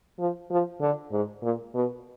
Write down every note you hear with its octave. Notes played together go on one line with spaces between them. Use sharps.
F3
F3
D3
G#2
A#2
B2